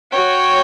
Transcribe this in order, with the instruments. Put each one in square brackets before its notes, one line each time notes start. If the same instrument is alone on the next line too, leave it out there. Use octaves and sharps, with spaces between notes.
[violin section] F#4 C#5 G5